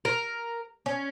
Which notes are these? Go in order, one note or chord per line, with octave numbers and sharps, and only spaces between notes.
A#4
C#4